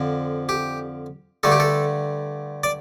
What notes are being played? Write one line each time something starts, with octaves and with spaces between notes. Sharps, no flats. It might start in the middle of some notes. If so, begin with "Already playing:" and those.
Already playing: F2 D3 F3
G4
G2 D3 A3 A4
G4
A4
D5